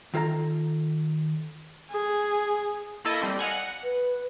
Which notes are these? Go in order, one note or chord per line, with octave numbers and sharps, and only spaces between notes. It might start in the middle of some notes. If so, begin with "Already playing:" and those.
D#3 F4 A4 F5 A#5
G#4
A#3 E4 A4 D#5
G3 C4
D#5 F5 F#5 G#5
F#5
B4